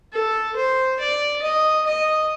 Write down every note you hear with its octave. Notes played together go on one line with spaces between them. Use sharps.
A4
C5
D5
D#5
D#5